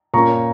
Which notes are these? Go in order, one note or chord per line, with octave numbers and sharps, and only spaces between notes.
A#2 A#3 C#4 A#5 C#6